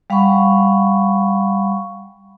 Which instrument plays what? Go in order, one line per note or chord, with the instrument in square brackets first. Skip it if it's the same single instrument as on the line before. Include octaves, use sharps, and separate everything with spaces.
[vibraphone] G3 F5 F#5 B5 C#6